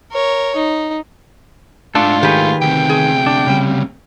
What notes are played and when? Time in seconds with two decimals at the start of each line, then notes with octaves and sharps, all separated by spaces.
0.11 A#4 C#5
0.55 D#4
1.95 G#2 A3 D4 F4 A4
2.23 D#3 G4 G#4 B4
2.62 D2 C3 G5
2.89 G#4
3.26 D4
3.47 C#3 G3